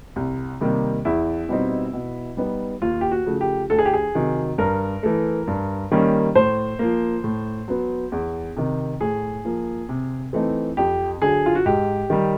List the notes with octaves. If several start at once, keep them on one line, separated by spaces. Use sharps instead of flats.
C2
C3 D#3 G3 A#3
E2 E4
B2 G3 C4 D#4
B2
G3 B3 D#4
D#2 F4
G4
F#4
C#3 F3 A3
G4
D2 A4
G#4
G4
G#4
C3 D#3 F#3
G2 A#4
E3 A3
G2
D#3 G3 A#3 C#4
A2 C5
F3 A#3
A2
F#3 B3
E2
C3 D#3
A2 G#4
F3 A#3
C3
E3 A3 C4 D#4
F2 G4
D3 F#3 G#4
F4
F#4
G#2 G4
D#3 G3